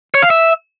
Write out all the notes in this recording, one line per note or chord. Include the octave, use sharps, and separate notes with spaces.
C#5
F5
E5